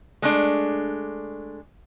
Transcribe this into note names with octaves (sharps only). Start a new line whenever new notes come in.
G#3 A3 D4